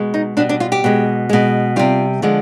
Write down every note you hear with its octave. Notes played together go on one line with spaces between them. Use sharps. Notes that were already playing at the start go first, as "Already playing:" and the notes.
Already playing: B2 G#3
D#4
B2 G3 D4
D4
F4
G4
B2 G#3
B2 G#3
C3 G3 F4
D3 F3 G#3